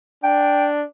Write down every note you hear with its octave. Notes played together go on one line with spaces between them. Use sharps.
D4 G5